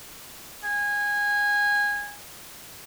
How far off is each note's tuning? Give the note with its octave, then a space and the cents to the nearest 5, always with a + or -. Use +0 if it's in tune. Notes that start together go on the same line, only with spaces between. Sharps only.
G#5 -20